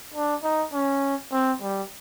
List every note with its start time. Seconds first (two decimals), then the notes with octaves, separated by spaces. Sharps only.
0.14 D4
0.43 D#4
0.73 C#4
1.32 C4
1.62 G3